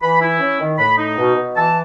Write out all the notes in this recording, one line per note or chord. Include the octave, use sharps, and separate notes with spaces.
E3 B5
E4
C#4
D#3
A2 B5
D#4
B2
B2
E3 A5